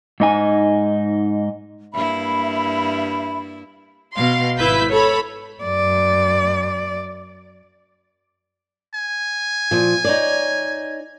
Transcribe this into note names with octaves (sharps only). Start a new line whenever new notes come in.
G#2 D#4 G#5
G2 A#3 E4 E5 B5
B2 F5 C6
G#1 E4 B4 G6 B6
A4 C#5 B5
F#2 D5
G#5
A#2 F3
D#4 C#5 D5